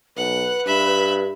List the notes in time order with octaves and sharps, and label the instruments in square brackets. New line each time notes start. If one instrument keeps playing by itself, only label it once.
[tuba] B1 [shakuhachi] B4 [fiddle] F#5
[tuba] G2 [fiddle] E5 B5